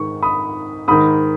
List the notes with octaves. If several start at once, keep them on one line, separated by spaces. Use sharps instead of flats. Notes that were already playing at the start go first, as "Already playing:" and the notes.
Already playing: G#2 D#3 C#6
B5 D#6
G#2 D#3 B5 D#6